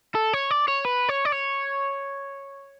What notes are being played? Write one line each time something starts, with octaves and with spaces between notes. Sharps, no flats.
A4
C#5
D5
C#5
B4
C#5
D5
C#5